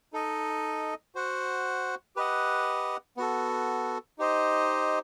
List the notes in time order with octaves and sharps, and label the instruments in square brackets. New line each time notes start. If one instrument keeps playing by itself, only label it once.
[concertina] D#4 A4 D#5
F#4 C5 F#5
G4 B4 D#5 F#5
B3 F#4 A4
D#4 G4 C5 D#5